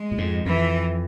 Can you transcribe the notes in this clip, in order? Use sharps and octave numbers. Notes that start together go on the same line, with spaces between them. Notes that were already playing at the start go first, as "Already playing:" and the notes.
Already playing: G#3
A#2
F2 G#2
F2 E3